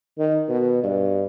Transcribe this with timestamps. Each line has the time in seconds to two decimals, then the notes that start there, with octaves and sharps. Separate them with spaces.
0.18 D#3
0.49 B2
0.84 G2